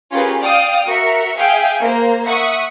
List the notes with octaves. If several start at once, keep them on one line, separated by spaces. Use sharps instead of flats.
C#4 F4 G4 G#4 A#4 B4
D5 F5 G5 D#6
F#4 A#4 E5 C#7
G#4 E5 F5 G5
A#3 C5
E5 F#5 C#6 D#6